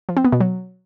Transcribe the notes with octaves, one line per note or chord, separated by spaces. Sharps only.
F3
C4
B3
B2
F#3